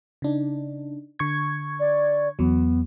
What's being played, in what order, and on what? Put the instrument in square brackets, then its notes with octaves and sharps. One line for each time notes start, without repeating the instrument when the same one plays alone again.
[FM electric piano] C#3 D4 D#4
D3 C#6 G#6
[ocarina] D5
[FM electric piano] E2 F#3 [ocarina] B3